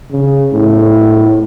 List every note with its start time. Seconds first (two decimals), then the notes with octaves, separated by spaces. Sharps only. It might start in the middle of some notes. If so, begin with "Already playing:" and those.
0.10 C#3
0.52 A2